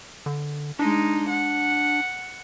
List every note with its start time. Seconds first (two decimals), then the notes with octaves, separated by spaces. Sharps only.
0.26 D3
0.79 G#3 D4 D#4
1.29 F#5